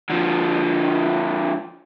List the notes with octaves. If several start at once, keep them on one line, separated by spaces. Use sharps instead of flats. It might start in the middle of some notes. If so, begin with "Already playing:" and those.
D3 F3